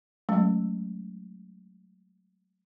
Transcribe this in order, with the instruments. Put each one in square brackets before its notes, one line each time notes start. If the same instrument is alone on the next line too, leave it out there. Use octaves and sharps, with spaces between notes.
[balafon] F#3 G#3 A3 C#4